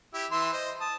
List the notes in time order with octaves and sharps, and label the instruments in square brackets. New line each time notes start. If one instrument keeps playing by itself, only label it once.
[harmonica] E4 G4 E5
E3 E5 C6
C5 D#5
A5 D#6